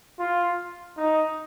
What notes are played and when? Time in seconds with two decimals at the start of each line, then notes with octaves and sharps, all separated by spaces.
0.19 F4
0.98 D#4